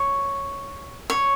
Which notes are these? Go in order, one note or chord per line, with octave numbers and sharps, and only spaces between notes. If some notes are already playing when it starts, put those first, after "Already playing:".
Already playing: C#5
C#5